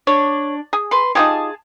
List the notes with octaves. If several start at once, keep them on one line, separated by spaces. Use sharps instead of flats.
D4 C#5
G#4
B4 C6
D#4 F4 G4 G#4 A5 D#6